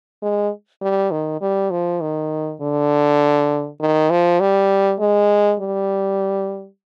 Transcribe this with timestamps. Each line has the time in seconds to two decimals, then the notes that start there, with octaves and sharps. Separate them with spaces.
0.22 G#3
0.82 G3
1.11 D#3
1.41 G3
1.71 F3
2.01 D#3
2.61 D3
3.81 D#3
4.10 F3
4.40 G3
5.00 G#3
5.60 G3